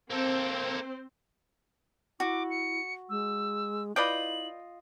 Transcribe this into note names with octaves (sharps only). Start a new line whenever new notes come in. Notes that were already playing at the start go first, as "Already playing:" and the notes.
A#3 C4 A4 C5
E4 F#4 D6
C#7
G#3 E6
E4 F4 B4 D5 D#5 G5 F#7